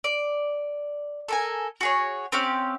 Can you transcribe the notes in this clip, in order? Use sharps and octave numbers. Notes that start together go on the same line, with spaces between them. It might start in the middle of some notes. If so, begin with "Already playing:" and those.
D5
A4 A#4 G#5
F#4 G#4 C#5
C4 C#4 G4 F5